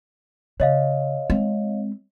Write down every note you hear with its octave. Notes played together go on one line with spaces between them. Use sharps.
C#3 C#5 D#5 F5
G#3 C4